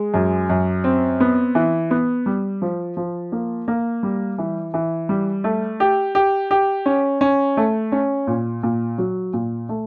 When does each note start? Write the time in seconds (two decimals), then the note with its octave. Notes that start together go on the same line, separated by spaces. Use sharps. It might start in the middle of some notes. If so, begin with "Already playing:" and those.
Already playing: G#3
0.14 F#2
0.50 F#2
0.84 C4
1.20 B3
1.55 E3
1.91 B3
2.26 G3
2.62 F3
2.97 F3
3.32 A#3
3.68 A#3
4.03 G3
4.38 E3
4.74 E3
5.09 G3
5.44 A3
5.80 G4
6.15 G4
6.51 G4
6.86 C#4
7.21 C#4
7.57 A3
7.92 C#4
8.27 A#2
8.63 A#2
8.98 F#3
9.33 A#2
9.69 A3